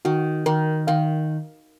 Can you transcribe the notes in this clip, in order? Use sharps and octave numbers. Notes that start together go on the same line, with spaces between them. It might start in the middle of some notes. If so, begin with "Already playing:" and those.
D#3 F#4
D#3 A#4
D#3 F5